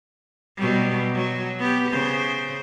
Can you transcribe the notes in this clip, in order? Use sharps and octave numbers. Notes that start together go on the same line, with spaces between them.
B2 F#3 G3
F#3
B3 G4
C#3 C5